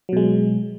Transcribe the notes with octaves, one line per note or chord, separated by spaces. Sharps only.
B2 F#3 G#3